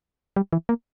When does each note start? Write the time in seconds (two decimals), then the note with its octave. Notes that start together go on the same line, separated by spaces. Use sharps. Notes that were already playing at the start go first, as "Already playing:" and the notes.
0.36 G3
0.53 E3
0.69 A#3